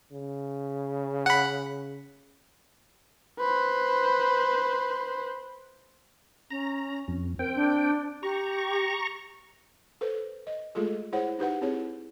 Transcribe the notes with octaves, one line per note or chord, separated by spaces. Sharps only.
C#3
F#5 B5
B4 C5
C#4 A#5
F2
C4 A#4 G5
D4
G4 A#5 C#6
A4 B4 C5
D#5
G#3 A3 F4 G#4 A4
E4 G#4 C5 C#5 F#5
D#4 G4 B4 F#5
C4 E4 G#4 C#5